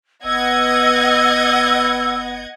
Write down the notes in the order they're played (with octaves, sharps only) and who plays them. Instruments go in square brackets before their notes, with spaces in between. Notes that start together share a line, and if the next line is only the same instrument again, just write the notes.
[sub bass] F#1 [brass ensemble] B3 [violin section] D#5 F#5 G#6 [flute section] E6